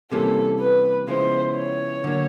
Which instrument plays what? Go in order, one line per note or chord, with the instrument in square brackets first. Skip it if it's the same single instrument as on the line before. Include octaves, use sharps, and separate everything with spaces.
[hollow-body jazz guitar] C3 E3 G3 A#3 C#4 [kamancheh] A4
[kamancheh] B4
[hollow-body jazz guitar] C#3 F3 G#3 B3 E4 [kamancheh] C5
[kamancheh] C#5
[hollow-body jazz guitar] D3 F#3 A#3